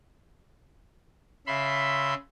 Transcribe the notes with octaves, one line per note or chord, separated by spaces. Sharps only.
C#3 E5 B5 C6